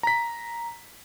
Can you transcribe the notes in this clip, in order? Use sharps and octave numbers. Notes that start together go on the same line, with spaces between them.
A#5 B6